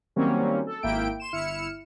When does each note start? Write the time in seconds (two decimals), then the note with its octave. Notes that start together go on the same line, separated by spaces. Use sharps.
0.16 D#3 F#3 G3 A#3 C4 C#4
0.67 A4
0.83 G#1 A#3 E4 G5 D7
1.20 C6 E7
1.33 G1 E4 F6 C#7 E7